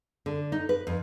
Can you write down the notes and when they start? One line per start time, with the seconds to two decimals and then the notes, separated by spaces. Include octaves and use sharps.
0.26 D3
0.52 D#4
0.69 B4
0.87 F2